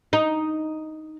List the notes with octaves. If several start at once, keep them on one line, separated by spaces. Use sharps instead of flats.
D#4